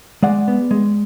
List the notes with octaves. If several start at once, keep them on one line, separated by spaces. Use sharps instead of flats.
G#3 D5 F#5
B3
G#3